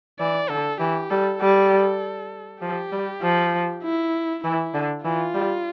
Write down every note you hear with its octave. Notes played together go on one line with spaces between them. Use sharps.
E3 D5
D3 A4
E3 G4
G3 A4
G3 A4
F3 G4
G3
F3
E4
E3 E4
D3
E3 F4
G3